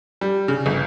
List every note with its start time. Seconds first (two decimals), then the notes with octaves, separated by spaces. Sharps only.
0.21 G3
0.48 C#3
0.66 G1